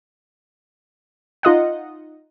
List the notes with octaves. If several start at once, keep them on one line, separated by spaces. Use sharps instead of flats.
D#4 F4 D#5 F#5